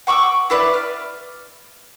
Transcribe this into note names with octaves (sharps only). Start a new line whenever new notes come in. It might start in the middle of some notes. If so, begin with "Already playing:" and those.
F#5 C#6 D6 E6
E4 B4 D5
F6